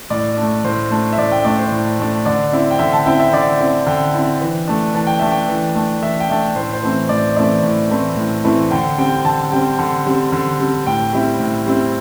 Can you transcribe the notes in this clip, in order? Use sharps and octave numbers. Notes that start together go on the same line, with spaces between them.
A2 D5
A3 D4
A2 C5
A3 D4
E5
A2 D5
G5
A3 D4 D5
C5
A2
A3 D4
D3 D5
C4 E4
G5
D3 E5
A5
C4 E4 G5
E5
D3 D5
C4 E4
D3 G5
C4 E4
E3
A3 D4
E3 A5
G5
A3 D4 E5
G5
E3
A3 D4
E3 E5
G5
A3 D4 E5
A2 C5
C5
E3 A3 C4 E4
A2 D5
E3 A3 C4 E4 D5
A2
E3 A3 C4 E4
A2
E3 A3 C4 E4
D3 G5
G3 C4 G5
D3 A5
G3 C4 G5
D3
G3 C4
D3
G3 C4
A2 G5
G3 C4 E4
A2
G3 C4 E4